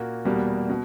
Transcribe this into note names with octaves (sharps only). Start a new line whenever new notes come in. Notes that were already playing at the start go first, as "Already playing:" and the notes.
Already playing: A#2 A#3 F#4
E2 B2 G3 A#3
B2